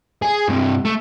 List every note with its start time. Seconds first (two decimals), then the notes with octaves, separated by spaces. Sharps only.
0.22 G#4
0.49 G2 C3
0.85 A3